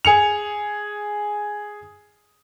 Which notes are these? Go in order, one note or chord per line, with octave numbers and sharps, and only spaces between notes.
G#4 C#7 F7